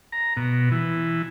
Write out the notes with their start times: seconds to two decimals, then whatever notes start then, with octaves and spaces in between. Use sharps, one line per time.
0.12 A#5
0.37 B2
0.72 E3